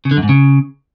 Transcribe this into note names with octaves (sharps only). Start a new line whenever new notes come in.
C#3
D3
F#2
G#2
C#3